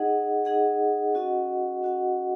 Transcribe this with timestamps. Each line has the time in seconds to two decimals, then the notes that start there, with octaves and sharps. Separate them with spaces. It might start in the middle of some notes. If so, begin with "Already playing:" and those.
Already playing: D#4 G#4 D#5 F#5
0.45 D#4 G#4 D#5 F#5
1.14 C#4 F#4 D#5 F#5
1.83 C#4 F#4 D#5 F#5